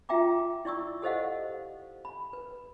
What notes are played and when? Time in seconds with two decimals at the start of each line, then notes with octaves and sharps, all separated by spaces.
0.09 F4 F#4 E5 G5 A#5 D6
0.65 E4 D5 C#6 E6
1.02 G4 A4 C5 D#5 F5 F#5
2.05 B5
2.33 B4